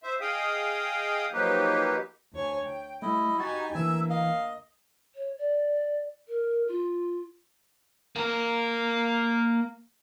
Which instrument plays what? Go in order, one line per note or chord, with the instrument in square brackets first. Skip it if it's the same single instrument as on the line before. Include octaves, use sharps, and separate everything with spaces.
[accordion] C5 E5
G#4 D#5 F5 G5 D#6
F3 F#3 A#3 D#4 G4 B4
[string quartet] D2 C#5 G#5
G5
[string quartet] G3 [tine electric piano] A3 [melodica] E4 D#5
[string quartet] D#4 G4 G#5 [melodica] F#4 [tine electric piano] B5 A6
[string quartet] D2 A#3 [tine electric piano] E3 [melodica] E5 E6
[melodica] D#5 [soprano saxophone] F5
[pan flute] C#5
D5
A#4
F4
[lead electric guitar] A#3 A#4